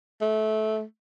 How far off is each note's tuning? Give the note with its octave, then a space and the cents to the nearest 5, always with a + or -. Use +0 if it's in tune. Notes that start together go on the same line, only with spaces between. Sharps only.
A3 -20